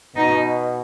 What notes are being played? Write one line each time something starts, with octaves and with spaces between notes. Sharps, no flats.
B2 D#4